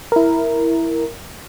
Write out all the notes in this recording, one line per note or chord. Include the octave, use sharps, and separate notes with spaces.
E4 A#4